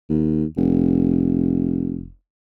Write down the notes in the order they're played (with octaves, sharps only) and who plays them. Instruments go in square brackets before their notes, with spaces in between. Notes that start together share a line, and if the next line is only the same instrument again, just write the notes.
[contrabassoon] D#2
F1